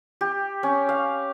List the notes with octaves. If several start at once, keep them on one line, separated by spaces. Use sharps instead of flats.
G4
C#4
F5